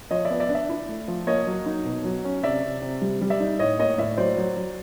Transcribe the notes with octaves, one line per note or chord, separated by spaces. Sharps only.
F3 C#5 D#5
D5 E5
B3
D5 E5
D4
D5 E5
E4
A3
F3
A#3 C#5 D#5
F#3
D#4
B2
F#3
C#4
C3 D5 E5
C3
C3
G3
G3
D5 E5
D#4
A2 C#5 D#5
A#3 C#5 D#5
A2 D5 E5
F#3 C5 D5
F#3
F#3